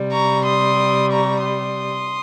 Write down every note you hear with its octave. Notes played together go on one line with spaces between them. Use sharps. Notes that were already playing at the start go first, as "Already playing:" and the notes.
Already playing: C3 G3
A#5 C#6
C6 D#6
A#5 C#6
C6 D#6